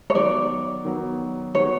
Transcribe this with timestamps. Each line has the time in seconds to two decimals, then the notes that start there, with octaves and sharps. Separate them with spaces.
0.10 C#5
0.14 D#3 F#3 B3 D5
0.85 D#3 F#3 B3
1.55 D#3 F#3 B3 C#5